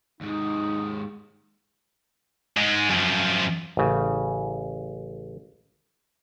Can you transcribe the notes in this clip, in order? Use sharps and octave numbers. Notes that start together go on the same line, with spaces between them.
D#2 G#2 D#4
G#2 G#3
F#2 F3
A1 C#3